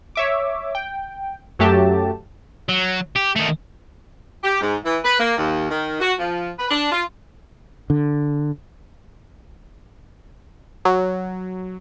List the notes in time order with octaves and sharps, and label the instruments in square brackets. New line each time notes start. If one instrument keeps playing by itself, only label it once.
[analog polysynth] C#5 E5 D6
G5
F#2 F#3 A3 G4 A5
[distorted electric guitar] F#3
G4
D#3 A3
[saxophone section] G4
G#2
E3
B4
A#3
D#2
D#3
F#4
F3
B4
D4
F4
[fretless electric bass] D3
[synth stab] F#3